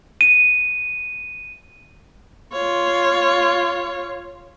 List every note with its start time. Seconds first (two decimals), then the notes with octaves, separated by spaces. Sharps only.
0.21 D#7
2.53 F4 C#5